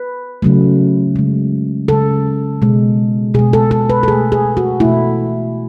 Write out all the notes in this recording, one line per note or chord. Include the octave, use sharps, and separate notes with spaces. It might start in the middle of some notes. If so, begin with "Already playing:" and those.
Already playing: B4
C#3 F#3 A3
C#3 G#3
C#3 G#3 A4
B2 G#3
B2 G#3 G#4
A4
A4
B4
A4
B2 A3 G#4
G#4
F#4
B2 A3 E4